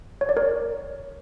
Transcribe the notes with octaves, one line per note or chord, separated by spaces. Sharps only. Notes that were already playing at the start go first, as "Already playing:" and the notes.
C#5
D5
A#4 C#5